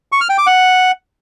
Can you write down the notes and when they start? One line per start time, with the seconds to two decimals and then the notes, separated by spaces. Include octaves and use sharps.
0.12 C#6
0.21 F6
0.29 G5
0.38 D6
0.47 F#5